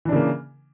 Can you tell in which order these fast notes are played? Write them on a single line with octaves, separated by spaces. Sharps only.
E3 D4 C#3 A#3